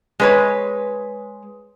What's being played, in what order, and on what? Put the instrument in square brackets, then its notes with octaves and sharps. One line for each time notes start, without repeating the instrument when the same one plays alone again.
[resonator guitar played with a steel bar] G#3 B4 C#5